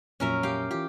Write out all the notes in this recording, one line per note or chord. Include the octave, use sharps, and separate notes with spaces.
F2 A#2 F#3 C#4 A#4 E5
G4 F5 G5
E3 F4 G4